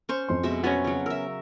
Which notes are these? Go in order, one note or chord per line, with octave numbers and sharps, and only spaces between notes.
C#4 C5 C#6
F2 C6
B2 G#3 E5
F#3 B3 C#4 F#4 G#5
C#3 F#3
A#4 E5 E6